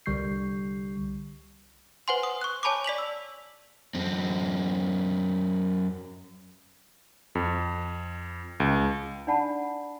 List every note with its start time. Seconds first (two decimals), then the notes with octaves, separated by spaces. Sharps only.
0.06 C2 D3 G3 C#6 G6 C7
2.08 B4 C5 F#5 G#5 C6
2.23 D#6
2.41 C#6 F#6
2.63 C#5 G#5 A5 B5 C#6 D6
2.84 D5 B6 F7 F#7
2.98 E6
3.95 F#2 C4
7.35 F2
8.60 C#2
9.27 D4 D#4 D5 F#5 A5 B5